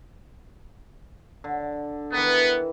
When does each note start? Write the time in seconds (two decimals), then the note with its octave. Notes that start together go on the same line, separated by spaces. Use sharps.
1.44 D3
2.12 D#3 E3 B3